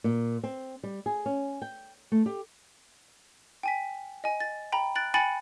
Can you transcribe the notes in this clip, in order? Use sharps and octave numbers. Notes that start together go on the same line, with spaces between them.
A#2
C4
G3
G#4
C#4
G5
A3
G4
G5 G#5 B6
D#5 G#5
A6
G5 A#5 B5
F#6 A6 D7 F#7
G5 G#5 B5 A6 C#7 F#7